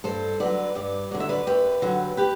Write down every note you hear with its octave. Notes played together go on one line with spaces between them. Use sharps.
G2 A4 C5
D3 F#3 B4 D5
G2 B4 D5
D3 F#3 D5
E5
B4 D5
F#2 G4 B4
D3 F#3
G4 B4